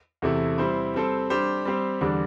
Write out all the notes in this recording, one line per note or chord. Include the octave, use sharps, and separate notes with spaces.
E2 C3 A3 E4
G3 C4 E4 C5
G3 C4 A4 C5
G3 D4 G4 C5
G3 C4 G4 C5
E2 D3 G3 D4